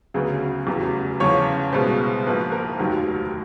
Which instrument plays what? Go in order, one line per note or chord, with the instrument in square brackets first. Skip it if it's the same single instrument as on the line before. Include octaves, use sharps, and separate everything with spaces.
[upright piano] D2 C#3 F#3 B3 G#4
F1 E2 C#3 F#3
E2 C#3 F3 C#5
C2 B2 G#3 B3 C5
A#1 G#2 F3 A#3 B4
A#4
F1 D#2 D#3 F#3